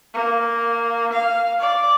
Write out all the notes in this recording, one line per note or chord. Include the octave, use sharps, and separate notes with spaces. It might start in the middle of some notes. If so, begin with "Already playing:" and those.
A#3
F5
D5